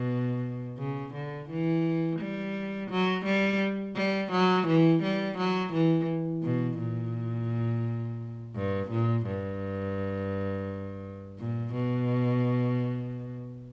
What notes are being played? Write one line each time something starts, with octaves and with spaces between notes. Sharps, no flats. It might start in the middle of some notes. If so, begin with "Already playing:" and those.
Already playing: B2
C#3
D3
E3
G3
F#3
G3
G3
F#3
E3
G3
F#3
E3
B2
A#2
G2
A#2
G2
A#2
B2